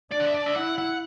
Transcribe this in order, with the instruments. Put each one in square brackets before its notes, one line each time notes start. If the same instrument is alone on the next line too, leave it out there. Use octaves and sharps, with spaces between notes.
[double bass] D4 [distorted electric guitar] D5
[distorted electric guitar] F#5
E5
D5
E5
[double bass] E4 [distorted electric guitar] F#5
[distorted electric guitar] F#5